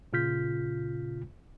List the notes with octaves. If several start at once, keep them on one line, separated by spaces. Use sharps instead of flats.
A#2 C#3 F4 F6 G6 B6